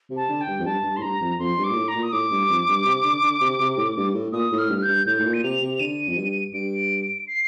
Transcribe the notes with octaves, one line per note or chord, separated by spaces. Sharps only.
C3
A5
D3
G5
G2
F2
G2 A5
G2
A2 C6
G2 A#5
F2
F2 C6
G2
D6
A#2
A2
A#5
A#2
D#6
A2 D6
G2
F2
G2
C3
D3
D3
C3
C3
A2
G2
A2
A#2 D#6
A2
F6
G2
F6
G6
G2
A2 G6
A2
A#2
D#7
C3 F7
C3
F7
D3 D#7
F2
G2
G2 D7
C7